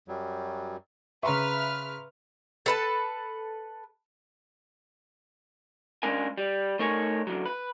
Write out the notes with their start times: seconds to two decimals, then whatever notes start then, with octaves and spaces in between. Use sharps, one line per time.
0.08 F#2 F#3 G3
1.23 C#3 B4 E5 A#5 C6 C#6 F6
2.66 A4 B4 A5
6.03 G#3 C#4 D4 F4 A#4 G#5
6.38 G3
6.79 A3 D#4 A#4 C#5 G#5
7.27 F#2 D3 F3 F#3
7.45 B4